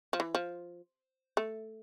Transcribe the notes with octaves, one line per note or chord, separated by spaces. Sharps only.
F3
E3
F3
A3